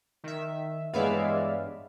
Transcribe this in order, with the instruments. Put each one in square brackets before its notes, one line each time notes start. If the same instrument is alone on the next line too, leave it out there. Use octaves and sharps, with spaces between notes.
[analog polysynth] D#3 E5
[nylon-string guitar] G2 B3 C#5 [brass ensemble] E3 G#3 [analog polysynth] D5 E5 F5